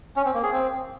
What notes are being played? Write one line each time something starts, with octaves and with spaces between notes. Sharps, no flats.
C#4
C4
A#3
G#4
C4